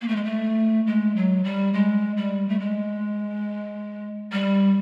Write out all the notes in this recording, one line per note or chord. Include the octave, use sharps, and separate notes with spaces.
A#3
A3
G#3
A3
G#3
F#3
G3
G#3
G3
A3
G#3
G3